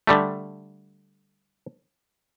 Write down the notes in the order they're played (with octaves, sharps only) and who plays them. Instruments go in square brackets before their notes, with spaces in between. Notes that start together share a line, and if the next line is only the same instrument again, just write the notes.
[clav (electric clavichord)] D3 G3 A3